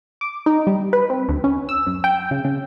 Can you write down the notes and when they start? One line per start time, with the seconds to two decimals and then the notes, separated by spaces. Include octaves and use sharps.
0.21 D6
0.46 D#4
0.67 G3
0.93 B4
1.10 C4
1.28 D2
1.44 C#4
1.69 E6
1.86 F#2
2.04 G5
2.31 C#3
2.45 C#3